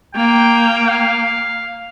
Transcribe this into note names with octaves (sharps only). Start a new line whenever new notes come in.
A#3 G5
F5